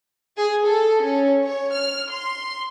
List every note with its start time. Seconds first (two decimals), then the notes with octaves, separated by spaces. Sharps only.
0.38 G#4
0.66 A4
1.02 C#4
1.43 C#5
1.73 F6
2.11 C6